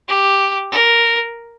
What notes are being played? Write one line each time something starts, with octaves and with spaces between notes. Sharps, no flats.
G4
A#4